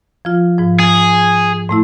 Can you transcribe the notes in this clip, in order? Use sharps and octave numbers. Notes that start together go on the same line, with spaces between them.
F3 F4
G#2 F3
G#4
A2 A3 E4